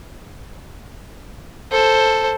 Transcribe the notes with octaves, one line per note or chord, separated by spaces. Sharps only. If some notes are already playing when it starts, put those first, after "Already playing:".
A4 C5